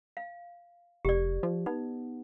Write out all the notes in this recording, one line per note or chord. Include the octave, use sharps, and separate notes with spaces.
F5
F1 G4 D5
F3
B3 D#4